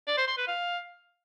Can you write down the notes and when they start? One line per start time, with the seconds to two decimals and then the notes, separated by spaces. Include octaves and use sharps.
0.07 D5
0.17 C5
0.27 C6
0.37 B4
0.47 F5